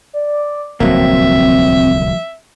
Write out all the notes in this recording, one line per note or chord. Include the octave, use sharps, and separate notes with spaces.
D5
D1 C2 F2 A#2 F#3 A#3 C4 E5